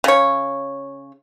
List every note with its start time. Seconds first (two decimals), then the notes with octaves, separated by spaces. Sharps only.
0.04 C#3 C#5